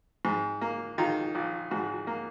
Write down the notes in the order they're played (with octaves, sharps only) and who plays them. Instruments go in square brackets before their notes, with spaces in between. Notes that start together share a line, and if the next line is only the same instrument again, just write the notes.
[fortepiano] G#2
A#3
D#3 F4
A#1
G#2 F#4
A#3